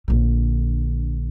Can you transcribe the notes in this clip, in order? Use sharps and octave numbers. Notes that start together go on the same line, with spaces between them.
A#1 D3